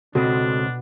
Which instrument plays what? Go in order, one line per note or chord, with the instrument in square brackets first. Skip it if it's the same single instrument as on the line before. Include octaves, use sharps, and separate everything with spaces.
[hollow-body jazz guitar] C#2 C4 [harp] B2 [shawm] D4 [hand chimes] F#4 A4